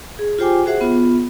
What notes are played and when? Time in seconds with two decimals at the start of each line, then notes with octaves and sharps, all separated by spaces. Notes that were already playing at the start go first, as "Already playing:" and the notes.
0.19 G#4
0.39 F4 G4 C5 G5 G#5 D6
0.66 F#4 G#4 C5 E5 F#5
0.81 B3 F4